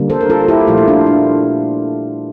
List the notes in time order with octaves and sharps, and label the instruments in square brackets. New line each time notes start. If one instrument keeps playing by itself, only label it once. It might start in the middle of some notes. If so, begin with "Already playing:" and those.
Already playing: [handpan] D3 G3 A#3
A4 C5
A#4
F4 A4
E4 G4
A#2 F3 A3 F4
E4
D4 F4
D4